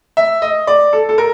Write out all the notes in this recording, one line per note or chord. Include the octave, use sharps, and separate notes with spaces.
E5
D#5
D5
A4
A4
A#4